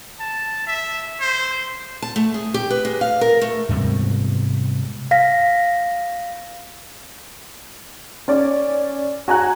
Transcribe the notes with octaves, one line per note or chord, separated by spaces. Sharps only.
A5
E5
C5
A5
A3
G#4
G4
B4
G#3
F5
A#4
A3
G#2 C3 G3 B3
F5 A#6 B6
C#4 C#5 D5
F#4 G#5 A#5 F#6